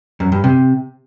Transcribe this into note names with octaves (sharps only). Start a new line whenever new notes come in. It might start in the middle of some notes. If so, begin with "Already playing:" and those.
F#2
G2
C3